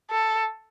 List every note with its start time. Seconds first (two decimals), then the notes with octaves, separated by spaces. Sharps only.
0.10 A4